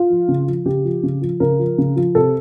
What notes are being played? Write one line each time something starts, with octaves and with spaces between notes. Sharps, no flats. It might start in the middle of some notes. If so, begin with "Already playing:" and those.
Already playing: F4
F3
C#3
F3
C#3 G4
F3
C#3
F3
C#3 A#4
F3
C#3
F3
C3 A4